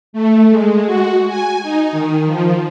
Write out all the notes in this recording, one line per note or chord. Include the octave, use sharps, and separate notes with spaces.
A3
G#3
F#4
G#5
D#4
D#3
F3